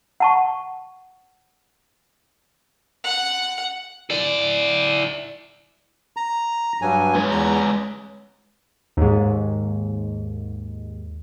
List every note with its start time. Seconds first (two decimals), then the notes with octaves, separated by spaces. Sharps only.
0.20 F#5 A5 C#6
3.04 F#5
4.10 E4 D5
6.17 A#5
6.82 G2 F#3 G#5
7.15 G#3 B4 C#5
7.31 E2 A#5
8.97 D#2 G#2